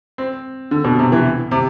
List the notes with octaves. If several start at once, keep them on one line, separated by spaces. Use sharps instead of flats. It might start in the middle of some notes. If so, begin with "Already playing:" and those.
C4
D3
B2
C3
E3
C3